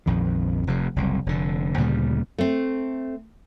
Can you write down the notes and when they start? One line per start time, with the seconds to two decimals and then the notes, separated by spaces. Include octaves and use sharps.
0.06 A#1 F2 D#3
0.67 F1 F2 C3
0.96 F#1 C2
1.26 F1 D3
1.78 D2 A#2 C#3 G3
2.38 A3 C4